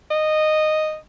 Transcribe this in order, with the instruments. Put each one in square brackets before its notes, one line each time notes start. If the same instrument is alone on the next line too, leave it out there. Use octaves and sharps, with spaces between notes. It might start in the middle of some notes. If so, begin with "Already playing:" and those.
[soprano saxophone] D#5